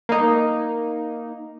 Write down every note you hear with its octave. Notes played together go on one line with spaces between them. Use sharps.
A#3 D#4